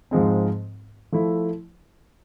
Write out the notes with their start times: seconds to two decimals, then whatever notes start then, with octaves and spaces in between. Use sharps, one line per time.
0.11 G#2 F3 G#3 C4
1.12 F3 A3 E4